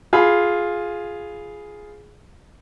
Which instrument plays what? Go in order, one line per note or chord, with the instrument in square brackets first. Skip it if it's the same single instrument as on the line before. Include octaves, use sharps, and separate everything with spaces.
[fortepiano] F4 G#4 G#5 B5